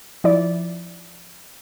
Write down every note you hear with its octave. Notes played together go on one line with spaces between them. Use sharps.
F3 E4 D5